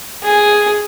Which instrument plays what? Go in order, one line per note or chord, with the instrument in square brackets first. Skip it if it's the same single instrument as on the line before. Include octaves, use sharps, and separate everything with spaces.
[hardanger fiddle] G#4